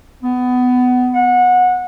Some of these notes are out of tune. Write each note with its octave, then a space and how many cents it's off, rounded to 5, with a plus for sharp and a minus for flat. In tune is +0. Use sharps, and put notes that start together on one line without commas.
B3 +20
F#5 -25